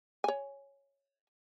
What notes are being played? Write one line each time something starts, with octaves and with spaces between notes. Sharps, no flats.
C#5 G#5